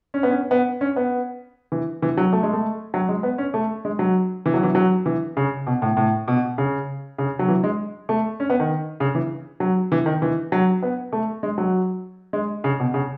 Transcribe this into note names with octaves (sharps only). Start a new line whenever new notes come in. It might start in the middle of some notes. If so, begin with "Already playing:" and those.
C#4
B3
C#4
B3
C#4
B3
E3
E3
F#3
A3
G#3
A3
F#3
G#3
B3
C#4
A3
G#3
F#3
E3
F#3
E3
F#3
E3
C#3
B2
A2
A2
B2
C#3
C#3
F#3
E3
G#3
A3
C#4
B3
D#3
C#3
E3
F#3
E3
D#3
E3
F#3
B3
A3
G#3
F#3
G#3
C#3
B2
C#3